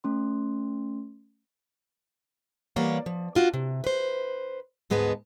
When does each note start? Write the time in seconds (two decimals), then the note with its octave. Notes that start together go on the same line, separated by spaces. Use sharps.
0.04 A3 C#4 C6
2.76 E3 G3 A#3 C#5 D5 F#5
3.06 F3
3.35 D4 F4 F#4
3.54 C3
3.84 B4 C5
4.90 D2 G#2 G#3 B3 B4 A5